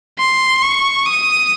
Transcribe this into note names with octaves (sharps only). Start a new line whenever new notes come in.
C6
C#6
D#6